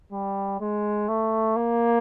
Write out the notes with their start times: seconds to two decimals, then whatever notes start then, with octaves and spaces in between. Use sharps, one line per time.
0.12 G3
0.60 G#3
1.08 A3
1.56 A#3